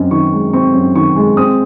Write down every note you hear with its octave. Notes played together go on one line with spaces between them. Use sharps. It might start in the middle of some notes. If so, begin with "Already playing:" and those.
Already playing: F#2 C4 D#5
D#3 C#6
G#3
C4 C#6
F#2
D#3 C#6
G#3
C4 D#6